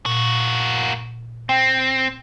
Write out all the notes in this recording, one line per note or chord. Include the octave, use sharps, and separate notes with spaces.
A#2 A#3 F#4
C4 G5